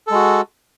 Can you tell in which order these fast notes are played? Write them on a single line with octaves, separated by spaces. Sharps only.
A4 G#3 F#4